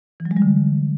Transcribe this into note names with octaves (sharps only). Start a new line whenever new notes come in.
E3
F#3
G#3
G3
D3